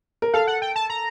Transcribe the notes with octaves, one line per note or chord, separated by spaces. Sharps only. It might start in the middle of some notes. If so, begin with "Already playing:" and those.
A#4
A4 F5
F#5
G5
A5
A#5